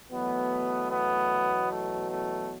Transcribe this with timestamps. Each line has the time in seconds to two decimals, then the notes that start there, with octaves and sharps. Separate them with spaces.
0.10 E2 B2 F#3 A3 B3
0.90 B3
1.70 A3
2.11 A3